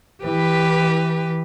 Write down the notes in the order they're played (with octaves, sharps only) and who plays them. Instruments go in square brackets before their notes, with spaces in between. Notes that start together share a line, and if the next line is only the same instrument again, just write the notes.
[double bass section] E3 [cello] G4 B4